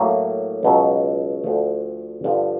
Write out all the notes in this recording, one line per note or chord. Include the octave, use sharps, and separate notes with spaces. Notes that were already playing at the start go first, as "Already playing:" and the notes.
Already playing: A2 F#3 A#3
C#2 B2 F#3
D2 D3 F3 A3
G2 D3 F3